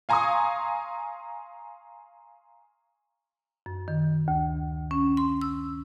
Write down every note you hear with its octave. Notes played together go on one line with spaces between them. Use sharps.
F5 G#5 A#5 C6 C#6 D#6
F#2
D#3
D2
C#4
C6
E6